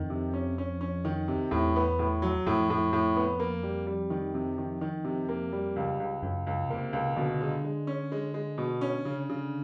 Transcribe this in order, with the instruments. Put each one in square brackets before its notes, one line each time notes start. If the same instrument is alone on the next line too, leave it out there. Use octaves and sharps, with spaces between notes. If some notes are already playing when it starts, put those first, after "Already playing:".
Already playing: [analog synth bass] F2 [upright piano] D#3
[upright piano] C3
C#4
C#4
C#4
D#3
C3
[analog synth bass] E2 [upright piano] A2
[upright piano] B3
A2
F#3
[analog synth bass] F2 [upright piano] A2
[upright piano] A2
A2
B3
A#3
G3
G3
D#3
C3
D#3
D#3
C3
A#3
G3
C#2
C#2
[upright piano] C#2 [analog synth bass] F#2
[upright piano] C#2
[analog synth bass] C3 [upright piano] A#3
[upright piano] C#2
[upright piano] B2 [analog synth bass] D3
[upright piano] G#3
G#3
C#4
G#3
G#3
B2
C#4
C#3
C#3